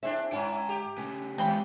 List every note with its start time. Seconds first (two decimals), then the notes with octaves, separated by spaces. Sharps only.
0.03 C4 D4 E4 G#4 E5
0.32 G#2 C#4 E4 G5 A#5
0.69 G4
0.97 C#3 A3 C#4
1.38 D#2 G#3 C4 G5 B5